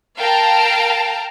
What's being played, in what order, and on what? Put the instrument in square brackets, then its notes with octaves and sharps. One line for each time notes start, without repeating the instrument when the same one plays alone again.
[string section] A#4 F5 G5 A5 A#5